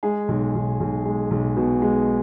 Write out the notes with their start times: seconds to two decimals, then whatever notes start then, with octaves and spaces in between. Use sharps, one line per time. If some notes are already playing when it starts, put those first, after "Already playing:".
0.03 G#3 G#4
0.28 B1
0.54 B1
0.80 B1
1.05 G#3
1.31 B1
1.56 B2
1.82 G#3